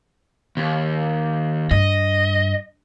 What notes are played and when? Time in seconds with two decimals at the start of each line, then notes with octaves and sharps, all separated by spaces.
0.57 D#2
1.71 G2 D#5